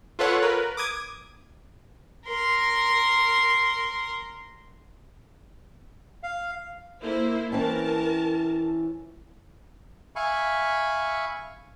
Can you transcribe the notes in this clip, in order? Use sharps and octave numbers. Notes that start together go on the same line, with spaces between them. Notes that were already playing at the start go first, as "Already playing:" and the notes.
F4 A4 B4 C#5 F#5
A#4 B4
D6 D#6 G#6
A#4 C6
F5
A#3 E4 C5
E3 C4 C#4 A#4 A5
E5 F5 G#5 B5 C#6